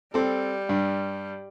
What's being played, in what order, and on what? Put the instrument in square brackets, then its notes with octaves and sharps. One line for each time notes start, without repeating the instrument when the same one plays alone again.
[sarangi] G3 [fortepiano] C4 A4
[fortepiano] G2